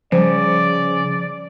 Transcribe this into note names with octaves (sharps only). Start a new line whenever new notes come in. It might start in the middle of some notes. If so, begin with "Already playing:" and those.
C#3 F3 G3 C5 D5